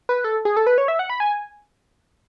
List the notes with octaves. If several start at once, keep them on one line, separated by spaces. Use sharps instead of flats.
B4
A4
G#4
A4
B4
C#5
E5
F#5
B5
G#5